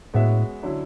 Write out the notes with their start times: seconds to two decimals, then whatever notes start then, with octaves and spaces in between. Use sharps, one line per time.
0.14 A2 G#3 B3 F#4 C#5 E5
0.63 D3 F#3 C#4 E4